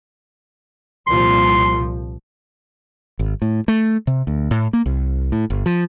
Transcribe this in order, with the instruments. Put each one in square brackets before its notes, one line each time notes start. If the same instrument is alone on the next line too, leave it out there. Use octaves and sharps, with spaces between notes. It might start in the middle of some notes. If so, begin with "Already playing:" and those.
[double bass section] C2 A#2 F3 [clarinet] C6
[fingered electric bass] G#1
A2
A3
C3
D2
A2
A#3
C2
A2
G1
F3